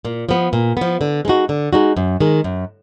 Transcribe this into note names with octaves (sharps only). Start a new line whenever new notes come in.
A#2
F3 B3
A#2
F3 B3
D3
G#3 D#4 F#4
D3
G#3 D#4 F#4
F#2
D#3 G#3
F#2